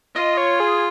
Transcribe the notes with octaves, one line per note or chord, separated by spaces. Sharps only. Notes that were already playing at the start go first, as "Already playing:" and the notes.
F4 D#5
C#5
G#4